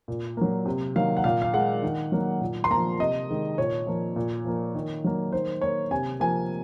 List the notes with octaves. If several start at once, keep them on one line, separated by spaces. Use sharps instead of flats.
A#2
F#3 A#3
C3
D#3 F#3 A#3 F5
F#5
A#2 F5
F5
G#3 F#5
D#3
F#3 A#3
A#2
C6
F3 A#3 A#5
C3 D#5
D#3 G#3
A#2 C#5
F3 A#3
A#2
F3 A#3
D#3
F#3 A#3
D#3 C5
A#3 C#5
C3 G#5
F3 A#3 G#5